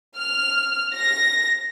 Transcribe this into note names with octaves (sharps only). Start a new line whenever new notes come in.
F6
A#6